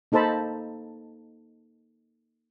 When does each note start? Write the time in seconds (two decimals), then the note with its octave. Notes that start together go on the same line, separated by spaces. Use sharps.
0.12 A#3 D#4 A4 C5 A5 B5